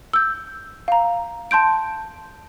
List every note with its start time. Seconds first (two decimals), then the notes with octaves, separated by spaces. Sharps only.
0.13 E6 G6
0.88 F5 A#5
1.51 A5 C6 G6 D7